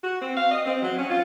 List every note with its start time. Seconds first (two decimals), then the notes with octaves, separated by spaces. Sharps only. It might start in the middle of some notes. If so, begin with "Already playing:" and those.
0.02 F#4
0.21 C4
0.36 F5
0.51 D#5
0.66 C4
0.82 F#3
0.97 C#4
1.10 F4